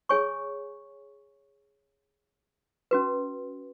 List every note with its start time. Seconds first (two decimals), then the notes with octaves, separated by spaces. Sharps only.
0.09 G#4 C#5 G#5 C#6
2.91 C#4 F#4 B4